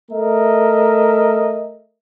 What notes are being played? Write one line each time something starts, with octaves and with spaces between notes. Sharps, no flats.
A3 A#4 D#5 E5